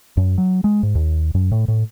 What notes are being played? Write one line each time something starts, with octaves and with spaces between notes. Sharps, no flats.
F#2
F#3
G#3
G#2
D#2
F#2
A2
A2